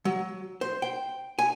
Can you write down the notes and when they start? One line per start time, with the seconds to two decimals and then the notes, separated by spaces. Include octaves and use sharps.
0.05 F#3
0.61 C5
0.82 G5
1.39 G#5